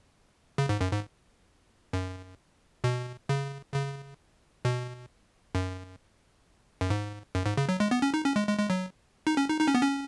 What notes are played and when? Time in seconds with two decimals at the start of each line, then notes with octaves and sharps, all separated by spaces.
0.58 C#3
0.69 G#2
0.81 F#2
0.92 G#2
1.93 F#2
2.84 B2
3.29 C#3
3.74 C#3
4.65 B2
5.55 F#2
6.81 F#2
6.90 G#2
7.35 F#2
7.46 G#2
7.57 C#3
7.69 F#3
7.80 G#3
7.91 B3
8.02 C#4
8.14 D#4
8.25 C#4
8.36 G#3
8.48 G#3
8.59 G#3
8.70 F#3
9.27 D#4
9.37 C#4
9.49 D#4
9.61 D#4
9.68 C#4
9.75 B3
9.82 C#4